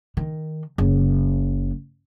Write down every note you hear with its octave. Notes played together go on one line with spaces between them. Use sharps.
D#3
F#1